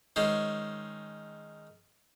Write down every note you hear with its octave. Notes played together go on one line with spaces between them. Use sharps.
D#3 G#3 C#4 C5